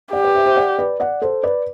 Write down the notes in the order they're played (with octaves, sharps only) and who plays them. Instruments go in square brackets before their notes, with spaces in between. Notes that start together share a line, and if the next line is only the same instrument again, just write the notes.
[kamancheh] G4 [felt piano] D5 F#5
[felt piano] B4 D5
C5 E5
C5 E5
D5 F#5
B4 D5
D5 F#5
A4 C5
B4 D5